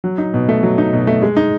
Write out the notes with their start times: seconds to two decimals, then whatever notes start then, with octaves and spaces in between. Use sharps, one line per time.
0.04 F#3
0.18 D#4
0.34 B2
0.49 A3
0.63 F#3
0.78 D#4
0.93 B2
1.07 A3
1.22 G#3
1.37 D#4